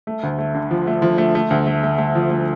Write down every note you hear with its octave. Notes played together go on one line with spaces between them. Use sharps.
A3
D2
A3
D3
F3
A3
F3
A3
A3
D2
A3
A3
A3
F3
A3